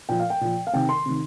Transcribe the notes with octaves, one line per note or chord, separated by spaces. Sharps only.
A#2 F3 G5
F5
G5
A#2 F3
F5
C3 D#3 G5
C6
C3 D#3